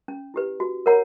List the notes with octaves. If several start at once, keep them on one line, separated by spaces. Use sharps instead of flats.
C#4
E4 G4 B4
F#4
A#4 C#5 F#5 A#5